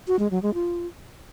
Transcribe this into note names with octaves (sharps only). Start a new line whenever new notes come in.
F#4
G#3
F#3
G#3
F4